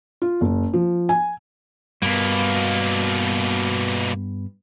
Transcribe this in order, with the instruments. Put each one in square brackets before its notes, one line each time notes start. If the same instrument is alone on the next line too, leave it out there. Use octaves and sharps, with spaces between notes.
[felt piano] F4
F#1
F3
G#5
[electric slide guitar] G2 B3 [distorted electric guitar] B2 A#3